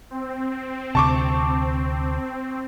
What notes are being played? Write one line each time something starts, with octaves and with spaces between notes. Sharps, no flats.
C4
D2 C3 A5 C#6 D6